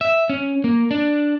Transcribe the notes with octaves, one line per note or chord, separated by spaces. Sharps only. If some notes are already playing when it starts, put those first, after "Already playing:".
E5
C#4
A#3
D4